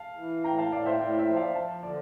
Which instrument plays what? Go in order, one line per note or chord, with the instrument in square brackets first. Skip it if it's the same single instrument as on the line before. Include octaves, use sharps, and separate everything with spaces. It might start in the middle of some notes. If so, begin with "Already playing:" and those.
Already playing: [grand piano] F5 A5
[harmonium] E3
[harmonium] A2 [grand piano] G5 A#5
[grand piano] F5 A5
[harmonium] A2 [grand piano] D5 F5
[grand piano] C5 E5
[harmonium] A2 [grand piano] D5
[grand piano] C5 E5
[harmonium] F3
[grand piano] D5 F5
[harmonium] F3 [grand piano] F5 A5
[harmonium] D3 [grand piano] D5